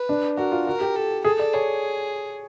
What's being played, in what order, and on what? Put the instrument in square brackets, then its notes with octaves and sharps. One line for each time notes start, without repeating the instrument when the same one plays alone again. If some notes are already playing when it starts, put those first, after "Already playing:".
Already playing: [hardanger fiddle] B4
[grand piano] D4
[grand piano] F#4 [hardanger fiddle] A#4
[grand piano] F4
[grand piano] F#4 [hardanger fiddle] A#4
[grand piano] G4
[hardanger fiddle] A4
[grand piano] G#4 [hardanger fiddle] A4
[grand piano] D5
[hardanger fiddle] G#4 [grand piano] C#5